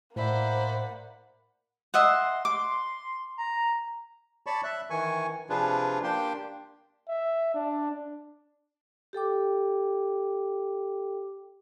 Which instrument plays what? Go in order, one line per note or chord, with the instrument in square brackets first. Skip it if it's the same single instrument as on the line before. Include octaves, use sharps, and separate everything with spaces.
[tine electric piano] A2 E5 [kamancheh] A#3 F#5 [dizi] C5 [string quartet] D5 B5
[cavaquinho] D#5 E5 F#5 [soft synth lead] C6
[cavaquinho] D6
[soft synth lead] A#5
[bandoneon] C#5 D5 A5 B5 C#6
E5 F#6
D#3 E3 G#5 C#6
C3 F3 D4 F4 G#4 B4
A#3 D4 G4 G5 C6
[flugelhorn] E5
D4
[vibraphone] G4 A4 G5 D6